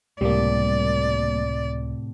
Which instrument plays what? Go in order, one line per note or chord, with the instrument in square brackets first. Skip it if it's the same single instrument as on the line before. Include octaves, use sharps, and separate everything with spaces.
[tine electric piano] C#2 [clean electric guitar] A2 C3 [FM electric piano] G3 A#3 [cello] D5